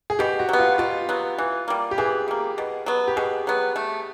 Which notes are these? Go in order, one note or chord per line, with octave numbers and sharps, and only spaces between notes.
G#4
B2 G4
F#4
F#3 B3
F4
B2 F4
F#3 B3
E3
G3 A#3
G4
E3 G#4
G3 A#3
B2
F#3 B3
G4
B2 G#4
F#3 B3
A3